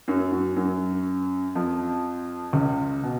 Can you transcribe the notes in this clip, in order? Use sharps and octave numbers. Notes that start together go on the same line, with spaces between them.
F#2 F#3
F#2 F#3
F#2 F#3
F2 F3
C#2 C#3
B2